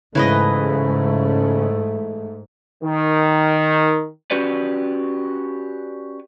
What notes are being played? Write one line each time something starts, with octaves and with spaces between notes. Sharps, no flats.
G#2 C#3 E3 A3 B4 D#5
D#3
C#4 F#4 G4 B4 D5